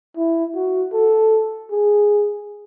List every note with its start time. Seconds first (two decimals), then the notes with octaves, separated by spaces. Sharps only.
0.17 E4
0.55 F#4
0.94 A4
1.71 G#4